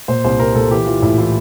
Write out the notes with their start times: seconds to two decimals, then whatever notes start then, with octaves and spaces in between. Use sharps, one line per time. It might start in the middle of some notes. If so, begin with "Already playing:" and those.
0.08 A#2 C5
0.24 C2 C5
0.40 C2 A#4
0.55 A#2 A4
0.71 E3 G4
0.86 E3 F4
1.02 A2 E4
1.18 E3 F4